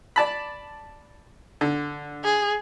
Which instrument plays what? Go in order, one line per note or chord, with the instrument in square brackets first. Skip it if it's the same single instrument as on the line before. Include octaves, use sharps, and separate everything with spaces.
[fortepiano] D5 A5 B5
D3
[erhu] G#4